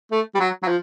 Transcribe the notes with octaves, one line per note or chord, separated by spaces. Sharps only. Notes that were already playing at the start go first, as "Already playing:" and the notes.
A3
G3
F#3
F#3
F3